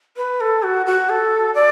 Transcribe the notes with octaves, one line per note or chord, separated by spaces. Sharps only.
B4
A4
F#4
F#4
A4
D5